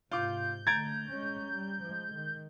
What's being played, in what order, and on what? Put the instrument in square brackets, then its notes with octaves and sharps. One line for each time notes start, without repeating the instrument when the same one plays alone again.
[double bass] G#2 C3 [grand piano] F4 D6 [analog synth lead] G6
[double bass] D3 A3 [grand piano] A#5 A6 D7 [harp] G#6
[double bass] G#3 C#4
G3
F3 G#3
D#3